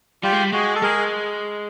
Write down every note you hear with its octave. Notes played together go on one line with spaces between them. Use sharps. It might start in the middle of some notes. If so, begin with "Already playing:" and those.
G3 F4 G4
G#3
G3
G#3 F#4 G#4
A4
G#3 G#4 A#4